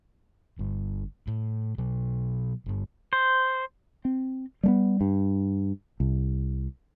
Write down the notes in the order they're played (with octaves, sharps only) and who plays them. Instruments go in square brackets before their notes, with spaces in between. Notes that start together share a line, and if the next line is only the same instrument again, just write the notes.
[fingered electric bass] G1 G2
A2
B2 F#3
G1 G2
[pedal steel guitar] C5
[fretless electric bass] C4
G3 A3 B3
G2
C2